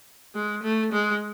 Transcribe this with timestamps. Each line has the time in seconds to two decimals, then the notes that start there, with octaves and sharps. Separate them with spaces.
0.35 G#3
0.63 A3
0.92 G#3